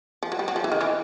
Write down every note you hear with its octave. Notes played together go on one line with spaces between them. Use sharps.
F3
F#3
G3
F#3
F3
E3
D#3
E3